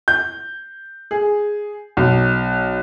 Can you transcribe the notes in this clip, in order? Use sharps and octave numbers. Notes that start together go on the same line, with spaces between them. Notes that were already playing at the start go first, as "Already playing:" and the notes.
G6
G#4
B1